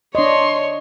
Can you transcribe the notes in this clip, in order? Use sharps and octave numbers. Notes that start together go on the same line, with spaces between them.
D4 C#5 D#5 C6